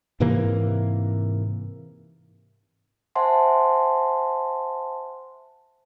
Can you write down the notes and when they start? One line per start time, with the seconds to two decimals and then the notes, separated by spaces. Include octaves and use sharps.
0.20 G#2 C3 E3 A#3
3.16 C5 E5 F#5 G#5 A5 C6